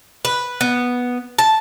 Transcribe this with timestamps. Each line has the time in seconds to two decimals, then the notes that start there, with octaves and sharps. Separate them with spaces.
0.25 B4
0.61 B3
1.39 A5